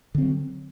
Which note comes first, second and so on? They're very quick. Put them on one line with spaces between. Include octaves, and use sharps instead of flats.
D3 C4 F#3